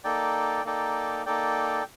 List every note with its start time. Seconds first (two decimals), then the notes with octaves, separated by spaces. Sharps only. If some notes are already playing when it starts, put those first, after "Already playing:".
0.04 A#3 D#4 A4 D5 G5
0.64 A#3 D#4 A4 D5 G5
1.26 A#3 D#4 A4 D5 G5